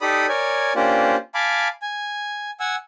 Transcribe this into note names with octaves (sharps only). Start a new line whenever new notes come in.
D#4 G4 A4 D5 B5 D#6
A#4 C#5 D5 G#5
A#3 C#4 D4 F4 G4 C5
F5 G#5 A5 B5 D6
G#5
F#5 G#5 E6